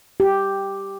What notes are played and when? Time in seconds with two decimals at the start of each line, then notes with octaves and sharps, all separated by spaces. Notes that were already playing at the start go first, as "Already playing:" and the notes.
0.20 G4